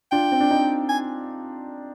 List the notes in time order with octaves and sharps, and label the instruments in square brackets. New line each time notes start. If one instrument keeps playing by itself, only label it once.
[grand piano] D4 F4 [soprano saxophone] G5
[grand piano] C4
D4
C4 D#4
[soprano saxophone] G#5